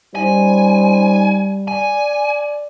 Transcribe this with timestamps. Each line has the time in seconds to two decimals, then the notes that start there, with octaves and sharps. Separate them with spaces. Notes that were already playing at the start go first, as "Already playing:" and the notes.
0.15 G3 C#4 D#4 C5 G#5
1.68 D5 G#5